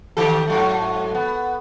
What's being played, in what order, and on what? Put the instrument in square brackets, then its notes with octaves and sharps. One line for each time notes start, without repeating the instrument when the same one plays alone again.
[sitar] D#3 G4 A4
G#2 F#3 A3
B3